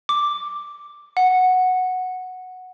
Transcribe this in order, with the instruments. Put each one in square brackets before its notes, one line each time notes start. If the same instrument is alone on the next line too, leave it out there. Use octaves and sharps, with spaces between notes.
[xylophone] D6
F#5